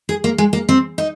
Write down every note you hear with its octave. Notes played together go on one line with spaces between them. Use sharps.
G#4
A#3
G#3
A#3
C4
D#4